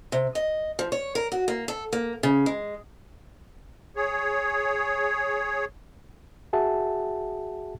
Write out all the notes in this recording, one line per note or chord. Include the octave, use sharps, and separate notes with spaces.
C3
D#5
F3
C#5
A#4
F#4
A#3
A4
A#3
C#3
G#3
G#4 C#5
F#4 G#4 E5 F#5 A5